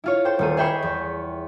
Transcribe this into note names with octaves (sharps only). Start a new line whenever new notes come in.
E4 F4 C#5
A4 C5 G5
D#1 A3 D#7
G#4 E5 G5 B5 C#6
E2